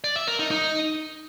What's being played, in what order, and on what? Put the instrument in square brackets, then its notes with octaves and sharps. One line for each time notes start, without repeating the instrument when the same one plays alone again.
[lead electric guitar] D5
E5
A#4
D#4
D#4